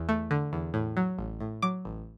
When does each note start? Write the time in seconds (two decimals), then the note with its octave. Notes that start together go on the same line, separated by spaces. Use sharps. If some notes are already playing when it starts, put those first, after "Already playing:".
Already playing: E2
0.09 A3
0.31 D3
0.53 E2
0.74 A2
0.97 F#3
1.19 A1
1.40 A2
1.62 F#3 D6
1.85 A1